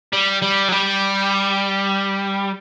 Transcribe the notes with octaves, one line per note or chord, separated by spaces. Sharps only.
G3
G3
F#3
G3